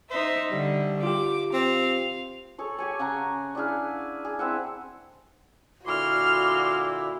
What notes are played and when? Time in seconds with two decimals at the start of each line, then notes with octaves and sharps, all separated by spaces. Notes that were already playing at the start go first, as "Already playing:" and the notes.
0.10 D#4 C5 E5
0.51 D3 G3
1.03 F4 G4 D6
1.53 C4 F5
2.58 G#4 A4 C#5
2.78 G4 C#5 G#5
2.99 C#3 F#5 G#5 A#5
3.55 D4 E4 G#4 F5
4.25 G#4
4.39 C4 E4 E5 F#5
5.86 A#2 D3 E4 F#4 C6 D6 F6